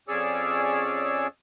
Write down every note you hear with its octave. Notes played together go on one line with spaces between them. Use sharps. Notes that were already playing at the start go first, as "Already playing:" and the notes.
F2 C#4 G#4 C#5 D5 E6